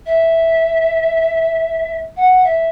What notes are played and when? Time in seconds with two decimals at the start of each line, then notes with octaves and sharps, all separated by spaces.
0.06 E5
2.16 F#5
2.44 E5